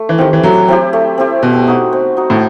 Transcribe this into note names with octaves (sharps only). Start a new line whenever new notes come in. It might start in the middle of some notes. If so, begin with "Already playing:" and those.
Already playing: A3
E3
D#3 C4 E4 G4
E3
F#3 A3
C4 E4 G4
A3
C4 E4 G4
B2 C4
D#4 F#4
C4
D#4 F#4
A2